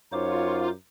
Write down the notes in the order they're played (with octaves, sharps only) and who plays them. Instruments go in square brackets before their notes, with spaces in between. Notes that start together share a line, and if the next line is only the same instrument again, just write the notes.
[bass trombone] F#2 [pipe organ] D#4 C5 D6 [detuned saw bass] F4 [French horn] C#5